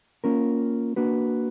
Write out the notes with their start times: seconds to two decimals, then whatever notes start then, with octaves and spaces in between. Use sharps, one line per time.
0.24 A#3 C#4 F4 A#4
0.96 A#3 D4 F#4 B4